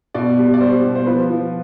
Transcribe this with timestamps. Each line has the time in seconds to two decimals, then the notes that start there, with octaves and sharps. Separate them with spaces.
0.14 B2 D5
0.38 G3
0.54 D5
0.61 G3 C5
0.84 B2
0.95 C5
1.06 F3 B4
1.30 F3